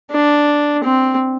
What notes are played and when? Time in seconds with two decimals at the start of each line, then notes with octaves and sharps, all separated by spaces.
0.11 D4
0.84 C4